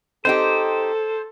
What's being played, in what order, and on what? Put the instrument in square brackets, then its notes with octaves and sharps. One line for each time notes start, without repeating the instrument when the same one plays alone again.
[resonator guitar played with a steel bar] C4 D#4 G4 [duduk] A4 [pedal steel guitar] C5